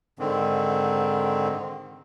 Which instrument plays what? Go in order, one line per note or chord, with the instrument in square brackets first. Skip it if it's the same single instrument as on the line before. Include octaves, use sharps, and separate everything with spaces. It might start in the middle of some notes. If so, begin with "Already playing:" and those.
[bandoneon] G#2 D3 D#3 C4